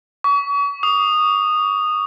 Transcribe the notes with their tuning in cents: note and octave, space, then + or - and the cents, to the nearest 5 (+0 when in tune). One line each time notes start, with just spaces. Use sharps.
C#6 +40
D#6 -15